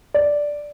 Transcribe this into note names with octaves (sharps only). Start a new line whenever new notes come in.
D5